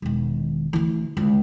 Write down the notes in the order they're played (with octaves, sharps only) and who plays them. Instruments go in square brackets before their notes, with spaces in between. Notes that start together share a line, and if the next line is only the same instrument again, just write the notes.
[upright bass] E1 D#3
D2 E3
C#2 D3